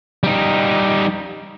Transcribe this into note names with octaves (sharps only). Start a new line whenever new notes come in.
G3 D#4